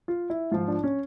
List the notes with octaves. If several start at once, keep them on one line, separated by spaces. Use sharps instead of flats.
F4
E4
G#2 F3 F4
D4
C#4